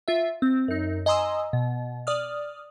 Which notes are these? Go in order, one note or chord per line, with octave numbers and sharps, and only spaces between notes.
F4 E5
C4
F#2 D#4
D#5 G#5 A#5 C6 D#6 E6
B2
D5 D#6 F6